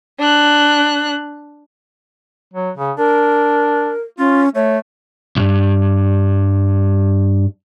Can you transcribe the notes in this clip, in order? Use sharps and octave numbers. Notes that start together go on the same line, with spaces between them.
D4 F#6
F#3
C#3
D4 A#4
C#4 F4
A3 C#5
B1 G2